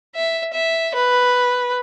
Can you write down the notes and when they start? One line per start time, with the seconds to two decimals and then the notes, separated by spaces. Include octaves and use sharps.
0.15 E5
0.53 E5
0.94 B4